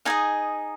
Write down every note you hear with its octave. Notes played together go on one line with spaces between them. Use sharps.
D#4 G#4 D#5 F5 G#5